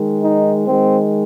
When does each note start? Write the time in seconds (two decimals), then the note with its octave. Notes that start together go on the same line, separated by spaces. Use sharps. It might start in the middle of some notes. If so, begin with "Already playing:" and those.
Already playing: D#3 G#3
0.23 D#4
0.67 D#3 G#3 C4